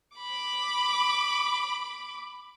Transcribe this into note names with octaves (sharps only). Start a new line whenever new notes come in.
B5 D6